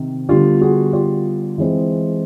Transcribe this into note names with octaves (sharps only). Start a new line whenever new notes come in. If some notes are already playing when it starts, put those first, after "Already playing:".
Already playing: C3 D#3
D3 G3 B3 F4 G4
F#4 G#4
F4 G4
E3 G#3 C4